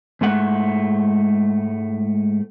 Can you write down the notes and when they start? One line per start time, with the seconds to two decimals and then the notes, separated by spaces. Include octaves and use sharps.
0.21 G#2 G#3 A3 F#5